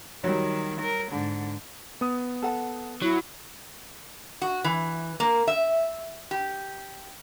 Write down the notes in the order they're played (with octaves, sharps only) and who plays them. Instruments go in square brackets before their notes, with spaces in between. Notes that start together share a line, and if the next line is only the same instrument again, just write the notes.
[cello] D#3 [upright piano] F#3 G3
[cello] A#4
G#2 D3
[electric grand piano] B3 D#6
[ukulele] A4 F#5 A5
[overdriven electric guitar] F#3 [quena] E4
[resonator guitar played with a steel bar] F#4
E3
A#3
E5
G4